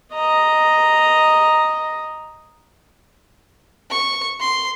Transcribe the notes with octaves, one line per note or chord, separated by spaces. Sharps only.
D#5 A#5
C#6
C6